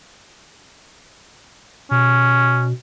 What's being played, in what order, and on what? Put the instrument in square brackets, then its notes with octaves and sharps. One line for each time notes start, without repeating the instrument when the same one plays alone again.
[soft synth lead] B2 [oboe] C#4